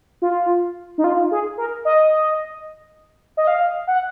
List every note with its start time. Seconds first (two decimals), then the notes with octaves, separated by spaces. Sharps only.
0.22 F4
0.98 D#4
1.04 F4
1.31 G#4
1.58 A#4
1.85 D#5
3.37 D#5
3.47 F5
3.87 F#5